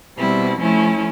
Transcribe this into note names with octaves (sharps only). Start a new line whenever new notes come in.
B2 G3 C4 E4
F3 A3 C#4 E4